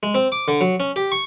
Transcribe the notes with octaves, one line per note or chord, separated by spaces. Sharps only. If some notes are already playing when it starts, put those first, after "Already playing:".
G#3
C4
D6
D3
F#3
C#4
G4
C#6